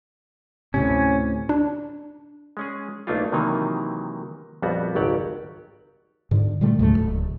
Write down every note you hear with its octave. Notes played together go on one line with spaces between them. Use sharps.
D2 A2 C3 C#4
D4
G#3 C#4 G#4
B1 A3 A#3 D4 D#4 F4
C3 D#3 E3 F#3 A#3 D#4
A#1 F2 G3 B3 F#4
G#1 C#2 F#3 G4 D5 F#5
G#2 D3
A#2 D3 G3 A3
C#2 G#2 F#3 A3
D1